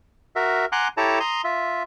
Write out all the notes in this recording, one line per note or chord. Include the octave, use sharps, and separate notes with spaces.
F#4 A#4 E5
F#5 G#5 A#5 C6 D6 F#6
E4 G4 A4 C#5 A5 A#5
A#5 C6 D#6
F4 E5